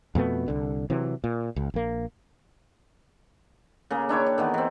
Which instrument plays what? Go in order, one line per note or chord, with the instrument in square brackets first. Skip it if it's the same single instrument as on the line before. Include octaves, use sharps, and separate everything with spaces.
[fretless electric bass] F2 B2 A3 B3
C2 D3
C3 E3 F#3
A#2
C#2
A#1 A#3
[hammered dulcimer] C#3 A#3 G#4
D4 E4 C#5 G5
D5
D#3 E3 B3
E3 C4